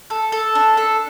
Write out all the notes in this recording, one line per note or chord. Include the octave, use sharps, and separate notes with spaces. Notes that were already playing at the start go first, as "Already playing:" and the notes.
A4
A4
D4
A4